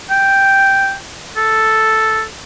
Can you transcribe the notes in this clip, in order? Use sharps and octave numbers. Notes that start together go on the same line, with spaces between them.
G5
A4